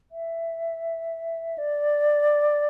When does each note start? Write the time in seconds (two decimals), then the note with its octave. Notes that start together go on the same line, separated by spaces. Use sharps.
0.12 E5
1.58 D5